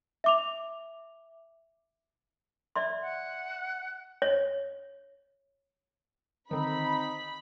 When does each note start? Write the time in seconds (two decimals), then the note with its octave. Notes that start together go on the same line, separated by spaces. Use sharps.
0.24 E5 D6 F7
2.76 D5 E5 C6
3.01 F#5
4.22 C#5
6.51 D3 D#3 C4 D#4 B5